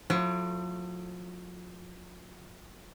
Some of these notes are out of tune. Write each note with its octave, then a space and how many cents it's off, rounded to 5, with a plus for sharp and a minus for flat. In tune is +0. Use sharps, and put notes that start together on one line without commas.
F3 +45 A3 +0 E4 +45